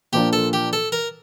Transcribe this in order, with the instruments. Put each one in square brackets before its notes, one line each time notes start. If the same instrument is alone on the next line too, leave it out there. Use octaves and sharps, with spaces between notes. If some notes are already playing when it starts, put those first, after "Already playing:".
[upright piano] A#2 F3 A#3 D4 F4 [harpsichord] G4
[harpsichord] A4
G4
A4
A#4